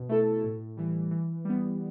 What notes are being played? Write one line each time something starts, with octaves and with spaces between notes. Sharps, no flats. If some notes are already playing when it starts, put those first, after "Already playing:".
Already playing: B2
A3 E4 A4
A2
E3 G3
E3
G3 B3